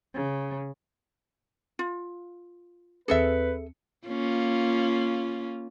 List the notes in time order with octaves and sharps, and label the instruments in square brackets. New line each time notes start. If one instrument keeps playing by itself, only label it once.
[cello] C#3
[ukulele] F4
[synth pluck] D#2 C4 C#7 [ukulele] G#4 A4 E5 [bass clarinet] B4
[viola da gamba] A#3 C#4 F4